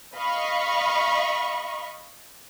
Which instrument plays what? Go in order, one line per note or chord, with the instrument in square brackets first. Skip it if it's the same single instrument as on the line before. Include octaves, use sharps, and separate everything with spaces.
[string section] D#5 F5 B5 C#6